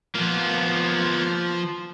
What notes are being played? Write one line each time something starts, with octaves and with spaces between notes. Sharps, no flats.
F3 A#3 B3 F4